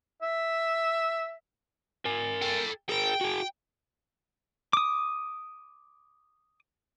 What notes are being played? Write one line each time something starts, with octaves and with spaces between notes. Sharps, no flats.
E5
A#4 G#5
A4 G5
G#4 A#4 G5
F#4 G#4
D6 D#6